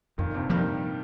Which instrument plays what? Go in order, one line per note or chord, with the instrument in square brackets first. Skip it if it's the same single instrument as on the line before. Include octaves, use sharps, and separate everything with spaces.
[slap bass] F2 [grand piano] A#2 D#3
[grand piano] G2 C3
[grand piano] D#3 G3 [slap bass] F3 A#3